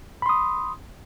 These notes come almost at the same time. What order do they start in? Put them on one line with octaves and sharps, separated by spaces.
B5 C6 D#6